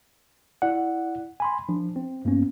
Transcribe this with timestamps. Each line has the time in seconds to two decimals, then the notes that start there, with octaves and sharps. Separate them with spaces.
0.62 E4 D5 F#5
1.40 G#5 B5 C6
1.69 F3 D4
1.96 C4
2.25 G2 A#3 B3 C#4